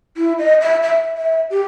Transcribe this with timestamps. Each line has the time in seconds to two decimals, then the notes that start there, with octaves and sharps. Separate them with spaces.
0.17 E4
0.39 D#5
0.61 E5
0.83 E5
1.17 E5
1.51 G4